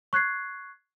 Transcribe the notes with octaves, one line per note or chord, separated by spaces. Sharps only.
C#6 F#6 G#6 C7